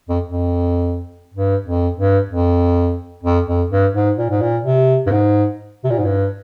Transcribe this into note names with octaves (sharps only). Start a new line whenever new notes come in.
F2
F2
G2
F2
G2
F2
F2
F2
G2
G#2
A#2
G#2
A#2
C3
G2
G#2
C3
A#2
G#2
G2